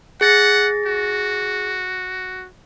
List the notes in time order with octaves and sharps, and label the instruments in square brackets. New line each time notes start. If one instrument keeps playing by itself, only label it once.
[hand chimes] G#4 A6 A#6 [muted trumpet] F#5
[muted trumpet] F#4